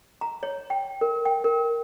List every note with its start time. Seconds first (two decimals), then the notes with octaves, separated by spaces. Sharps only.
0.21 A#5
0.43 C#5
0.70 G5
1.01 A#4
1.25 G5
1.44 A#4